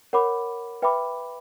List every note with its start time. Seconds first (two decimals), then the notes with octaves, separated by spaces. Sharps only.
0.13 A#4 C#5 F#5 B5 D6
0.82 B4 E5 G5 B5 D6